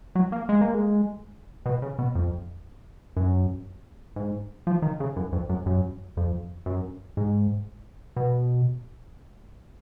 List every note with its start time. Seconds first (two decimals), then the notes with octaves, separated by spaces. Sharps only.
0.15 F#3
0.32 A#3
0.49 G#3
0.61 A#3
0.74 G#3
1.66 B2
1.82 C#3
1.99 B2
2.15 F2
3.17 F#2
4.16 G#2
4.67 F3
4.82 D#3
5.00 C#3
5.16 F#2
5.32 F2
5.49 F#2
5.66 F#2
6.17 F2
6.66 F#2
7.17 G#2
8.16 B2